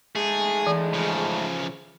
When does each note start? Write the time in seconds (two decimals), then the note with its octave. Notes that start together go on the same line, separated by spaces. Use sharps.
0.15 G#2 G#3 A3 G#4
0.67 E3
0.94 C#3 F3